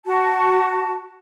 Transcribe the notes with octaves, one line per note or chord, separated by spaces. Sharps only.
F#4 A5